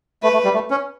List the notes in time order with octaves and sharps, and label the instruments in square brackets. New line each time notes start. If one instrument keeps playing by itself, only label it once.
[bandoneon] A3 [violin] B4
[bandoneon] A3
G3
A3
C#4